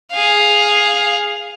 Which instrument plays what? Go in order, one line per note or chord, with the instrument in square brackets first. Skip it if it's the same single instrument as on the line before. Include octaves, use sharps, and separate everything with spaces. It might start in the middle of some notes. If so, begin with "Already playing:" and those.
[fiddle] G#4 F5